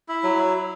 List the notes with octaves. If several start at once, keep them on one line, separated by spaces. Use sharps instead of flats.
E4
F#3